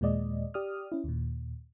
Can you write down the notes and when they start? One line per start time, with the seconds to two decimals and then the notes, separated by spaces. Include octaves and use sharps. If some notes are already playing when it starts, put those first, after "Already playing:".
0.01 D#2 A#2 G#3 D5 D#5
0.54 G4 D5 D#6 F6
0.92 C#4 E4
1.04 D#2 A#2